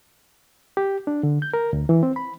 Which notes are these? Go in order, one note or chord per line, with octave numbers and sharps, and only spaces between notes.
G4
D4
D3
G6
A#4
D2
E3
C4
B5